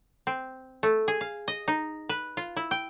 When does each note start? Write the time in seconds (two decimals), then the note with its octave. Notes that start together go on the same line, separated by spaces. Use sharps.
0.27 C4
0.83 A3
1.08 G#4
1.21 F5
1.48 D#5
1.68 D#4
2.09 B4
2.37 F4
2.56 E4
2.71 G5